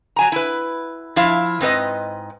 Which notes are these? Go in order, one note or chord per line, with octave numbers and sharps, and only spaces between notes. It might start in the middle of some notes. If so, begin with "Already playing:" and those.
F#3 G#5 A#5
E4 B4
F3 E4 F5
G#2 C4 B4 D#5